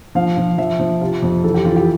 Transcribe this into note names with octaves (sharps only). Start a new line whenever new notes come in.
F3 F5
F3
F3 E5
F3
C3 F4
F2
E3 A4
G4
E3 F4
G4